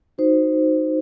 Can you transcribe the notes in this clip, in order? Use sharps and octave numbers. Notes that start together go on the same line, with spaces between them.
D#4 F#4 C5